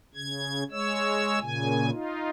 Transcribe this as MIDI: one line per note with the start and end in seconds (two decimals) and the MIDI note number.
0.14 0.63 49
0.14 0.63 92
0.71 1.39 56
0.71 1.39 73
0.71 1.39 88
1.39 1.90 46
1.39 1.90 49
1.39 1.90 80
1.91 2.30 63
1.91 2.30 65